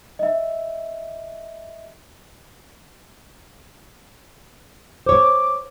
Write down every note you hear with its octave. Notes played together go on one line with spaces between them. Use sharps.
D#5 E5
C5 C#5 D6